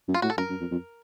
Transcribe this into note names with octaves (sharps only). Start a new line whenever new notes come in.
F#2
F4
A2 F#4
A4
F#2 A#4
F#2
F2
F2